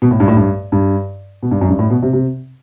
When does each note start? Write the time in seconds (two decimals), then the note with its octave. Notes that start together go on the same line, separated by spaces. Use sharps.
0.02 B2
0.11 A2
0.20 G2
0.28 A2
0.37 G2
0.72 G2
1.43 B2
1.51 G2
1.61 F#2
1.69 G2
1.79 A2
1.90 B2
2.03 C3
2.13 C3